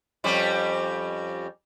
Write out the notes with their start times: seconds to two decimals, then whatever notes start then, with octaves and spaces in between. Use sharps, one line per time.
0.24 F2 G3 C#4